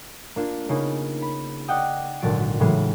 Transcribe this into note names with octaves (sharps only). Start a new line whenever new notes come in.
A#3 D4 F4
C#3 A#3 B3 C#4 D#4 G#4
B5
D5 D#5 F#5 G5 D#6
G#1 A#2 D3 F#3 A6 D7
A2 C#3 E3 F#3 G#3 C#4